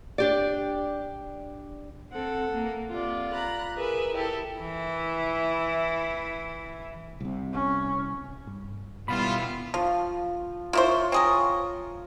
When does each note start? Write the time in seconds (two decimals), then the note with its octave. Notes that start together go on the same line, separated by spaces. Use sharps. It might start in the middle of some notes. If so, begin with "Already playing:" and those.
0.18 D4 G4 D5
2.12 C4 A4 F#5
2.52 A#3
2.90 C3 F4 D5
3.31 A#5 B5 F#6
3.77 G#4 A#4 B4 E5
4.13 E4 G4 A4
4.60 E3 E4
7.20 C2 C3
7.53 C#4
8.47 G2
9.08 B2 G3 B3 E4 F4 B5
9.74 F3 F4
10.73 A#3 E4 F4 C5 C#5
11.12 C4 G#4 A#4